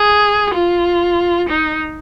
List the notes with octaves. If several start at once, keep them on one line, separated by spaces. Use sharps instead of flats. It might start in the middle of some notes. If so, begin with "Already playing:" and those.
Already playing: G#4
F4
D#4